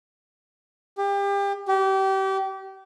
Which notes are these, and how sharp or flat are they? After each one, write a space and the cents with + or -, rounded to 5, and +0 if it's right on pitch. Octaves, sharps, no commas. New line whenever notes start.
G4 +30
G4 -30